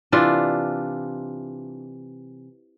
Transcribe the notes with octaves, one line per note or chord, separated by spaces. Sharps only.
C3 E3 D4 F4